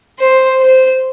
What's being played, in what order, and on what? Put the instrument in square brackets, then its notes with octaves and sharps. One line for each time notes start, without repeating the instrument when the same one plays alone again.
[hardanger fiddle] C5
C5